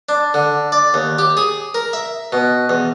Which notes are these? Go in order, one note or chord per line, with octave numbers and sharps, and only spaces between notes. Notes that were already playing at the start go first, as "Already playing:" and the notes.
D4
D3
D5
D#2
G4
G#4
A#4
E5
B2
E2